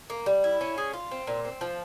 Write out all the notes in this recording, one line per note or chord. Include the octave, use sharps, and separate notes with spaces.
A#3
G3
E4
C#4
G#4
F4
C4
A#2
C4
F3